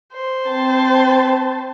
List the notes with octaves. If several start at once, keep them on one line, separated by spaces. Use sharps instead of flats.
C5
C4 A5